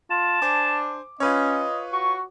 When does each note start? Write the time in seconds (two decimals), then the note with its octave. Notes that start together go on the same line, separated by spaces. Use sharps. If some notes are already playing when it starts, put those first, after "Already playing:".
0.10 F4 A5
0.42 D4 C5 G#5 D6
1.20 C#4 F4 B4 C#5 D#5
1.93 F#4 C#6